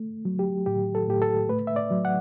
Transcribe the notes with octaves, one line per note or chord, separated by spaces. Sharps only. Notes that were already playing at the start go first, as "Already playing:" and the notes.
Already playing: A3
F#3
G4
A2 G4
A4
A2 G4
A4
A3 B4
E5
D5
F#3
F#5